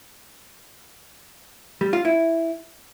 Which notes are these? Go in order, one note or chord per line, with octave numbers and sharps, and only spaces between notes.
G3
F4
E4